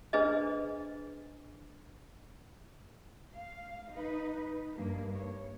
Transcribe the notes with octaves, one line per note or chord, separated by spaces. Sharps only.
D4 G#4 B4 C5 D#5
F5
D#4 B4
G2 A#3
C#5